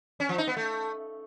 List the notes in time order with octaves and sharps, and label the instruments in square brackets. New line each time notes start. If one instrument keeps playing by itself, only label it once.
[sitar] C#4
F3
D#4
B3
A3